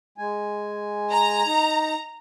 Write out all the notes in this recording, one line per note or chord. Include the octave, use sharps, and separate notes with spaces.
G#3 G#5
A#5
D#4